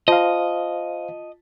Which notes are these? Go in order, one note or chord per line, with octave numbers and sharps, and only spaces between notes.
F4 C5 D#5 F5 A5